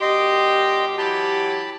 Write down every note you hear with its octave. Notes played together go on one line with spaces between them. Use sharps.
F#2 A#2 G4 D#5 C6
E3 F#3 G4 A5 B5